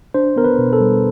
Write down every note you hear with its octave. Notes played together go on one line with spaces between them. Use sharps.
D4 C5
B3 A#4
B4
B2
A4
G3